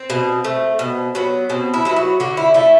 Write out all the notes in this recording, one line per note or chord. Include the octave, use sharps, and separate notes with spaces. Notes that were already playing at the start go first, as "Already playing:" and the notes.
Already playing: C4
B2
A3
B2
F#3 B3
B2 C4
E4
F#3 B3 E4
F#4
D3 F#4
E4
A3 E4